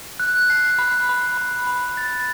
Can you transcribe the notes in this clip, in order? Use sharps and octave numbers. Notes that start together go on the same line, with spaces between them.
F#6
C7
B5
B5
B5
B5
A6